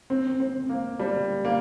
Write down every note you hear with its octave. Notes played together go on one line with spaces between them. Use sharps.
C4
C4
A#3
G3
A#3